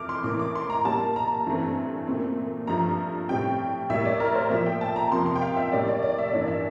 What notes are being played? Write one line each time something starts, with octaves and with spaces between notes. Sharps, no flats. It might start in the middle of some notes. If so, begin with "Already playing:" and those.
Already playing: F2 E3 A3 D6 F6
C6
A2 E3 A#3 D6
D6
C6
A#5
A#2 G3 A#3 A5
A#5
G2 E3 A3 C4
A#2 A3 C4
G2 F3 A3 A#5
A2 G3 C4 G5
A2 G3 A#3 E5
D5
A#4
C5
A#2 F3 A3 E5
G5
A5
A#5
F2 C3 F3 A#3 C6
C6
G5
F5
E5
A2 G3 A#3 D5
D5
D5
E5
G2 E3 A#3 D5
E5